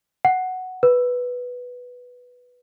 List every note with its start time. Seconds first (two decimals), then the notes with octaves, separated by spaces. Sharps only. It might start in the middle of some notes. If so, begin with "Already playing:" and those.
0.25 F#5
0.83 B4